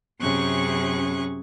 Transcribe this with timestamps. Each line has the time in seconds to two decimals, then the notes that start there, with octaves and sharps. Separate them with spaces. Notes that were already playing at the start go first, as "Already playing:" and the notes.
0.19 F#2 C3 C#4 G#4 C#6 F#6